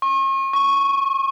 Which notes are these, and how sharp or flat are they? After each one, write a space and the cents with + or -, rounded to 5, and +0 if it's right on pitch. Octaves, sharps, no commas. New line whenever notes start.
C#6 -40
C#6 -5